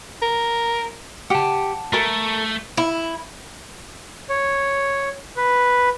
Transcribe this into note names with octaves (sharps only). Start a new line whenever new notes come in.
A#4
G4 F#5 A5
A3 A4 A#4
E4
C#5
B4